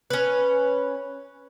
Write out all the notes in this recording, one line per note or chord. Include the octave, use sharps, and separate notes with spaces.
C#4 B4